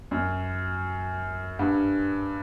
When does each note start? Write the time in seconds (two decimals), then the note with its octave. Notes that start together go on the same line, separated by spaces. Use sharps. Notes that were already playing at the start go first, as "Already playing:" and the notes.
0.11 F#2
1.59 G2